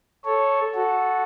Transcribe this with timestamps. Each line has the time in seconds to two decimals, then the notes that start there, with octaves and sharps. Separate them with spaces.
0.25 A4 C#5
0.75 F#4 A4